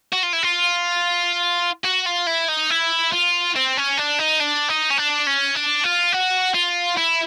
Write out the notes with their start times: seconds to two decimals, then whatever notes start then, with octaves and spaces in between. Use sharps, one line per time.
0.13 F#4
0.23 F4
0.33 E4
0.43 F4
1.84 F#4
2.05 F4
2.27 E4
2.48 D#4
2.70 E4
3.12 F4
3.56 C4
3.77 C#4
3.97 D4
4.19 D#4
4.40 D4
4.69 D#4
4.90 C#4
4.98 D4
5.27 C#4
5.55 D4
5.84 F4
6.12 F#4
6.55 F4
6.98 E4